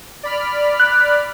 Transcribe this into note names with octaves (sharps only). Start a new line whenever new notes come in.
D5 B5 F6
F#6